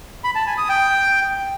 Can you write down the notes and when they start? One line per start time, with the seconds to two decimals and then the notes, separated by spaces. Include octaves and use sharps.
0.24 B5
0.35 A5
0.47 G#5
0.58 D#6
0.69 G5